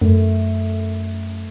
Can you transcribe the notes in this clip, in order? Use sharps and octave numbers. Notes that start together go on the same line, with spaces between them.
F#2 A3